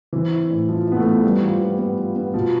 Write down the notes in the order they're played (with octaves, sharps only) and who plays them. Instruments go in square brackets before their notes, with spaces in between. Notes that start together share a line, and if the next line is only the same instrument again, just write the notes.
[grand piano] E3 [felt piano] C4
[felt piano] E4
A2
[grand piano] F3 [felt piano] E4
[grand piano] B3 [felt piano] E4
[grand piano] A3
[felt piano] F3
[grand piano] G3 [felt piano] B3
[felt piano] F3
B3
B3
F4
B3
[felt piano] B2 [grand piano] F3